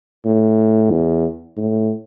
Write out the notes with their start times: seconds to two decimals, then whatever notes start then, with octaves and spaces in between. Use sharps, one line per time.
0.25 A2
0.91 E2
1.57 A2